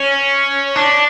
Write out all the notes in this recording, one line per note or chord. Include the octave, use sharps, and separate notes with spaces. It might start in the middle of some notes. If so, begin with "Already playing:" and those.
Already playing: C#4
D4